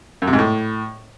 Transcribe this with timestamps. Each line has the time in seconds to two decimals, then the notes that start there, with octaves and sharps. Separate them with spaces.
0.22 F#2
0.27 C3
0.33 G#2
0.39 A2